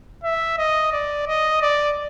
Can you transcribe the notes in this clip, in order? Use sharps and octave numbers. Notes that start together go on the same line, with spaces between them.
E5
D#5
D5
D#5
D5